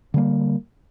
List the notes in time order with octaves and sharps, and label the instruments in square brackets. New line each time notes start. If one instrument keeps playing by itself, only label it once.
[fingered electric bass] D3 G3 A#3